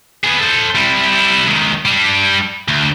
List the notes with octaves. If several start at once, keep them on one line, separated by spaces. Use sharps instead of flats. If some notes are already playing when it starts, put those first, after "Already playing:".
B3 G#4
A4 C5
G3 E4
C#2 D#3
G3 D4
D2